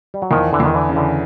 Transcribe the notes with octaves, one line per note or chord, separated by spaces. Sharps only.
G3
F#3
E2 D#3 F3
D3 E3
E2
D#3
D3 E3
C#3
D3 E3